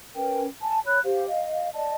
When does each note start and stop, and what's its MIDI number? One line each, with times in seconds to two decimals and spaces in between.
0.15 0.46 61
0.15 0.46 70
0.15 0.46 71
0.15 0.46 79
0.62 0.79 80
0.62 0.79 81
0.85 1.00 73
0.85 1.00 83
0.85 1.00 90
1.04 1.26 67
1.04 1.26 72
1.04 1.26 77
1.28 1.69 75
1.28 1.69 77
1.74 1.96 74
1.74 1.96 75
1.74 1.96 81